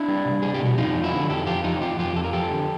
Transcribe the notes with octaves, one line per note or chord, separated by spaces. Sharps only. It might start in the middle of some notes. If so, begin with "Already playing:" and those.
Already playing: D4 E4
G3
C2
G3 G#4
G4
B2
F#4
F2 D#4 F4
F3
E4 F#4
D3
F2 G4 A4
F3 F4 G4
F2 D#4 F4
F2 F4 G4
F2 F4 G4
F2 A4
A#4
F3 G4 A4
D3